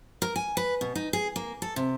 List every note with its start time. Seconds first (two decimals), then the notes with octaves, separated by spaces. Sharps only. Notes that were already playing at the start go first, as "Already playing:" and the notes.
0.22 A#4
0.36 G#5
0.57 B4
0.81 B2
0.95 D#4
1.13 G#4
1.36 A#3
1.62 A4
1.76 C3